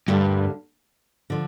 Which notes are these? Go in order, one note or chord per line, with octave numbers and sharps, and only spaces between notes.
D2 G2 D3 G3 A#3
D3 F3